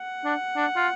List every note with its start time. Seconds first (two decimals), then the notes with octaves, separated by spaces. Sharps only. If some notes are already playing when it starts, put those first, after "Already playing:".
Already playing: F#5
0.25 D4
0.56 D4
0.76 F4